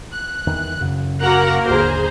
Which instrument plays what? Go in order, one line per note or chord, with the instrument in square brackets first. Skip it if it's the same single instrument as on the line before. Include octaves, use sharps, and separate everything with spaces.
[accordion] F#6
[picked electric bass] E2 D#3 E3
F#2 C#3
[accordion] A#3 A#4 [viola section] F#4 F#5 A#5
[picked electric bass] G#1 D#2 D3 [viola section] G#4 C5 A#5